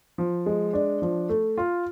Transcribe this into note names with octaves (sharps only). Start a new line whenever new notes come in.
F3
G#3
D4
F3
A3
F4